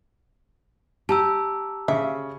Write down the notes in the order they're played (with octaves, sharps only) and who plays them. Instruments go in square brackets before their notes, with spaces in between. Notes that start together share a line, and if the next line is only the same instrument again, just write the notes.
[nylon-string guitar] G4 [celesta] A5 A#5 E6
[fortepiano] C#3 [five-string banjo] E5